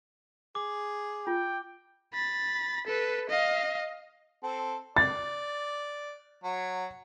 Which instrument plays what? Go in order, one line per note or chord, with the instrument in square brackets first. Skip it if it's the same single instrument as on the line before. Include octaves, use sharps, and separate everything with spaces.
[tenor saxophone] G#4 [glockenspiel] D6
[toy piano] F4 [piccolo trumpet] G5
[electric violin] B5 A6
A4 B4
D#5 F5
[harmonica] C4 A4
[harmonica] D5 [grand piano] A6
[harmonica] F#3